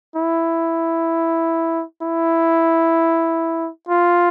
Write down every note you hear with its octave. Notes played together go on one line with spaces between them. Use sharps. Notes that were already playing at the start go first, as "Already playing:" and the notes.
E4
E4
F4